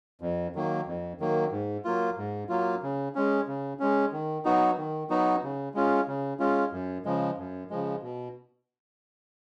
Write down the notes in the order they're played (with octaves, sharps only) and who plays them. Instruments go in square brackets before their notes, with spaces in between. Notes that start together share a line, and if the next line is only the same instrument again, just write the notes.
[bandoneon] F2
D#3 F#3 A#3
F2
D#3 F#3 A#3
G#2
F#3 A#3 F4
G#2
F#3 A#3 F4
C#3
G#3 C#4
C#3
G#3 C#4
D#3
F#3 B3 D#4 F#4
D#3
F#3 B3 D#4 F#4
C#3
G#3 C#4 F4
C#3
G#3 C#4 F4
F#2
C#3 F3 G#3
F#2
C#3 F3 G#3
B2